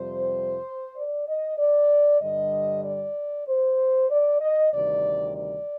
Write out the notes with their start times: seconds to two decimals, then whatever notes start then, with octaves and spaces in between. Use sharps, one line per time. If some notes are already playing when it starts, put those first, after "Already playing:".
Already playing: F2 C3 G3 C5
0.96 D5
1.28 D#5
1.58 D5
2.22 G2 D3 G3 D#5
2.84 D5
3.48 C5
4.10 D5
4.41 D#5
4.73 D2 C3 D#3 G3 D5
5.36 D5